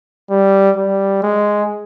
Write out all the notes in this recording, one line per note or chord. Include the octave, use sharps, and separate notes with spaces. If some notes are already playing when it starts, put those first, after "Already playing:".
G3
G3
G#3